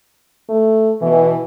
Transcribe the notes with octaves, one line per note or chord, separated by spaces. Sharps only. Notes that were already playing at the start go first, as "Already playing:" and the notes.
A3
B2 E3 E4